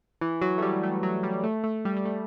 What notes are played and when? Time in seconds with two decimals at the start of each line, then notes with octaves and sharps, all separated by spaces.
0.21 E3
0.41 F#3
0.58 A3
0.62 G3
0.83 A3
1.03 F#3
1.23 G3
1.44 A3
1.64 A3
1.85 G3
1.97 G3
2.05 A3